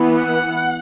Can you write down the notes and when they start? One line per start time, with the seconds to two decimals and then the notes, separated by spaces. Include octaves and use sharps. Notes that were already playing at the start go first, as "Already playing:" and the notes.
Already playing: E3 B3
0.17 F#5